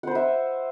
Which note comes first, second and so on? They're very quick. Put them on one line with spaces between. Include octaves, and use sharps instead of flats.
F#5 C5 B4 E5